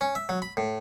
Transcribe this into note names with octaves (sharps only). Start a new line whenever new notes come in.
C#4
E5
F#3
B5
A2